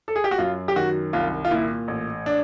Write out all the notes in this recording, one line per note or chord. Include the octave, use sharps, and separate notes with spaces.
A4
G#4
G4
F#4
F#2 F4
G4
D#3 F#4
C2 F4
F4
A#2 E4
A1
D4